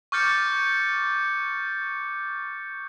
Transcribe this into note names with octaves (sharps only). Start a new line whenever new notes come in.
C#6 D6 F6 G6 A6 C#7